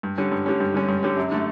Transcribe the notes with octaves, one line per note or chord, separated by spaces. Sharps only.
G2
D3 G3 C#4
G2
D3 G3 C#4
G2
D3 G3 C#4
G2
D3 G3 C#4
F#2
D3 A3